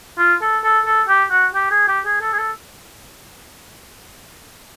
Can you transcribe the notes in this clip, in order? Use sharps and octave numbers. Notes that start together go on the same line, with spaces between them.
F4
A4
A4
A4
G4
F#4
G4
G#4
G4
G#4
A4
G#4
A4